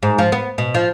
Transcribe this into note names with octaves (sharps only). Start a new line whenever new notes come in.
G#2
F3
B3
B2
F3